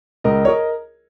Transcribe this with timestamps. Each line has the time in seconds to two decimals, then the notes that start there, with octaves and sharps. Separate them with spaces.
0.24 C#2 A#4 D#5
0.45 C#5
0.48 A#4 D#5